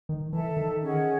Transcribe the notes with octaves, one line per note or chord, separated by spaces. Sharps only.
D#3
E3 A4 E5 A5
D#3
C#4 G#4 D#5 F#5